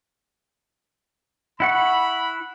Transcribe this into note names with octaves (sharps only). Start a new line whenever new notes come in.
E4 F#5 B5 C#6